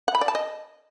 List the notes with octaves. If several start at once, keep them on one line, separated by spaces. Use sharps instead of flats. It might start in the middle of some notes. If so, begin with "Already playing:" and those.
F#5
B5
D5
A5
D#5